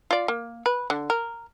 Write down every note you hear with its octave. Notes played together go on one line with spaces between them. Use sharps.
F4 D5
A#3
B4
D3
A#4